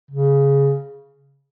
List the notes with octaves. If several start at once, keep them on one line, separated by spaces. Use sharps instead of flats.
C#3